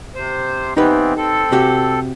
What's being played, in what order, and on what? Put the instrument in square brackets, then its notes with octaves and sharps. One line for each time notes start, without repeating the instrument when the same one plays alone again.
[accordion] C3 C5
[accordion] E3 B3 C4 [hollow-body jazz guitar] D#4 G4 B4
[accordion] C4 A4
[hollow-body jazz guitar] C3 F#4 G4